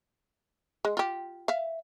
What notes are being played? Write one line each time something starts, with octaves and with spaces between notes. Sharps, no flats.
G#3
F4 G4
E5 F5